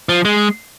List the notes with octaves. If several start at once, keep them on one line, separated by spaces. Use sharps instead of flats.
F3
G#3